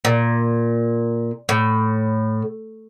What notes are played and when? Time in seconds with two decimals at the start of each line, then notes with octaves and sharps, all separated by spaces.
0.05 A#2
1.49 A2